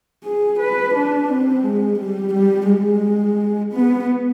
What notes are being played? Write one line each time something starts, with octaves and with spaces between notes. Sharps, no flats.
G#4
B4
D4
C4
G#3
G3
G3
G#3
B3